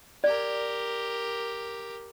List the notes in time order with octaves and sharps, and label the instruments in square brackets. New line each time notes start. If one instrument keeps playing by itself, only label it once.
[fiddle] G4 A#4 [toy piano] D5